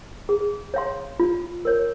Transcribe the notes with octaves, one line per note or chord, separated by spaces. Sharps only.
G#4
C#5 F5 C6
F4
A#4 C#5